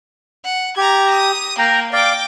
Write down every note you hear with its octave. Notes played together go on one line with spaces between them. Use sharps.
F#5
G4 A#5 G#6
D#6
A#3 A#4 G5 A#5
D5 F5 G5 D6